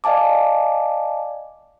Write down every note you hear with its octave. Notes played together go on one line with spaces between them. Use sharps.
D5 D#5 F5 G#5 A5 D6